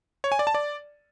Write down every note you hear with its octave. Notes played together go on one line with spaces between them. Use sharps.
C#5
G#5
D5
A5
D5